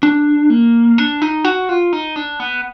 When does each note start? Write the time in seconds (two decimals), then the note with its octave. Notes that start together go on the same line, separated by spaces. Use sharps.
0.03 D4
0.50 A#3
0.98 D4
1.22 D#4
1.45 F#4
1.69 F4
1.93 D#4
2.16 D4
2.40 B3